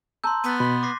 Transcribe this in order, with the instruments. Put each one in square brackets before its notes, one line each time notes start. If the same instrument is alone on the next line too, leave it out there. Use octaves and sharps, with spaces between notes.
[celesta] A5 A#5 E6 [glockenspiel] C6 G6
[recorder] B3 [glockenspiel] A6 B6 D#7
[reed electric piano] B2 [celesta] B5 [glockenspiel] C6 F#6 B6
[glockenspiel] D6 A#6 C7